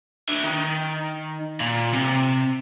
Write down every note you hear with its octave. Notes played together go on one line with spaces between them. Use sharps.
D4 E5
D#3
A#2
C3